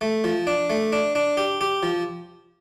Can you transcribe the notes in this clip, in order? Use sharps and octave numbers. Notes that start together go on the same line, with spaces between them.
A3
F3
D4
A3
D4
D4
G4
G4
F3